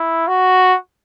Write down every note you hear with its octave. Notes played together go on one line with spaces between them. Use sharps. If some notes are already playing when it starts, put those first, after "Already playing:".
Already playing: E4
F#4